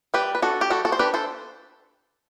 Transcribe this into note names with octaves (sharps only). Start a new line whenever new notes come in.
G3 G4 B4
B4
D4 F#4 A4
G4
G3 F#4 A4
F#4 A4
C5
D4 G4 B4
A4 C5